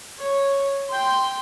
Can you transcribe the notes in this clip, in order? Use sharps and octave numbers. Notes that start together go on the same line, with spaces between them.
C#5
G5 C6